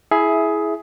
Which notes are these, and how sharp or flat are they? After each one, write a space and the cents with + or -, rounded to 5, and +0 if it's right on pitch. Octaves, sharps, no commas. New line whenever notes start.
E4 -5 G#4 +15 E5 +0